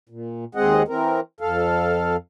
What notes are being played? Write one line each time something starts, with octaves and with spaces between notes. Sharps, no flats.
A#2
D#2 G#3 C4 G#4 D#5 F#5
E3 C4 A#4
F2 A4 F5